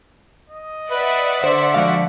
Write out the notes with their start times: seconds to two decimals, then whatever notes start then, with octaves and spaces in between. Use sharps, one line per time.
0.50 D#5
0.91 B4 D5 E5 F#5
1.44 D3 C5 C6
1.74 F3 G#3 F#4 F5